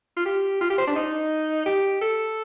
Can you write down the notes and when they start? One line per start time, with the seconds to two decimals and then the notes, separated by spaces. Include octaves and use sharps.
0.17 F4
0.26 G4
0.61 F4
0.70 G4
0.78 C5
0.87 D4
0.96 D#4
1.66 G4
2.01 A4